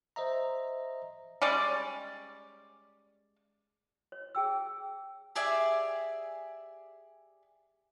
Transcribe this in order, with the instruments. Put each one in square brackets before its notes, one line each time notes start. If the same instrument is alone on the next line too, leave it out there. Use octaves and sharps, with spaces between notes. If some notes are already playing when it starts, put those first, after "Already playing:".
[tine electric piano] C5 D#5 E5 A#5
[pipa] G3 G#3 C#4 D5
[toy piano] C#5
G#4 G5 E6
[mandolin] G4 G#4 D5 E5